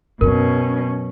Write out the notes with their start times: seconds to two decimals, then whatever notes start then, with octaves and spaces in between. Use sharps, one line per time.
0.21 F#2 B2 F#3 C#4 A#4